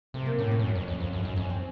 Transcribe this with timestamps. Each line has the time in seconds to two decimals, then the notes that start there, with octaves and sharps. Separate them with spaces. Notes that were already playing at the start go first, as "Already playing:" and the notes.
0.14 C3 A3
0.26 A#3
0.39 A2 C#4
0.51 C#4
0.59 A2
0.64 F#2
0.75 F2
0.88 F2
1.00 F2
1.13 F#2
1.23 F#2 D#4
1.36 F2 C#4
1.50 C4